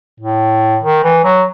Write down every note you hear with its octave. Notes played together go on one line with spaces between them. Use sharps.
A2
D#3
E3
F#3